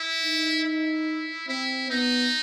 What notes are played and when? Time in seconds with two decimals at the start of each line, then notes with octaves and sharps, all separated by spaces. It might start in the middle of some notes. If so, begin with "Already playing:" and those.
Already playing: E4
0.22 D#4
0.64 E4
1.48 C4 E4
1.90 B3 D#4